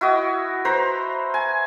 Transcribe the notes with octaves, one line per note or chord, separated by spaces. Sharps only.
E4 F#4 D#5
B4 C5 A#5
G#5